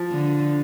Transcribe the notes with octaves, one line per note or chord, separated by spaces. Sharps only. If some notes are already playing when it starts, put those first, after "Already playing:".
Already playing: F3
D3